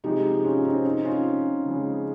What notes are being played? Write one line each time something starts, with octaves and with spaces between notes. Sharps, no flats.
C3 F3 G#3 D#4 G4
C#4 F4
C4 D#4
C4 D#4
C#4 F4
C#3 F3 G#3